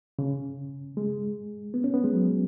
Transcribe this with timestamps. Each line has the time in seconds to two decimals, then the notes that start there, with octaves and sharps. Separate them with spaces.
0.19 C#3
0.97 G#3
1.74 B3
1.84 C#4
1.94 B3
2.04 G#3
2.14 F#3